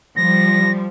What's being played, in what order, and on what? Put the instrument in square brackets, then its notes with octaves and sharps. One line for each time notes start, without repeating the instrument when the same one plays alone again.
[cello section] F3 G3 [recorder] A#6